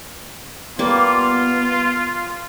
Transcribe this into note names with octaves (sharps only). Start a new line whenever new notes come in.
G3 A#3 B3 F4